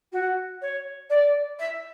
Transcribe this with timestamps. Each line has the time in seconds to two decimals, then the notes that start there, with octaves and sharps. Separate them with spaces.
0.12 F#4
0.61 C#5
1.09 D5
1.59 E5